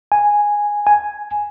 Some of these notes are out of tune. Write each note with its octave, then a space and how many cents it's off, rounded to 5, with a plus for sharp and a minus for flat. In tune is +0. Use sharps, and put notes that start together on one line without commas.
G#5 -5
G#5 +0